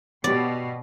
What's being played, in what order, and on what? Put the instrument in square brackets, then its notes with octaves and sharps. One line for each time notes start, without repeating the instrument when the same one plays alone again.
[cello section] B2 [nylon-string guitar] B3 G4 [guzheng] D5